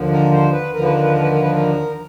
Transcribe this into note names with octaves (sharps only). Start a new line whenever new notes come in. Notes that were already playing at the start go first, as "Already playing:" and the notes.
Already playing: D#2 D3 F3
A#4
C5
B4
D#2 D3 F3 A#4
B4
A#4
B4
A#4
B4
A#4
B4
A#4